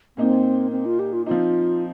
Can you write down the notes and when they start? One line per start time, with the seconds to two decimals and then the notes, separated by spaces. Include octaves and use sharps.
0.17 A#2 A#3 C4 D#4
0.71 C4
0.85 F4
0.99 G4
1.13 F4
1.26 F3 C4 D#4 F4